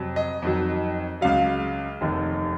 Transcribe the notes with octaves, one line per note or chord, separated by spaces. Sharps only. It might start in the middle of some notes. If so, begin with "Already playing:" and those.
Already playing: F2 C3 F#3
D#5
F2 D#3 F#3
C#2 C#3 F#3 F5
F1 D#2 D#3